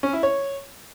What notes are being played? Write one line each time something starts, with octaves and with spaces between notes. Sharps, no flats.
C#4
E4
C#5